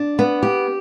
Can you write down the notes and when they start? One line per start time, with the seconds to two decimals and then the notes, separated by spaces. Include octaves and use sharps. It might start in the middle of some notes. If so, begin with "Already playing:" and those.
Already playing: D4
0.19 B3
0.43 G4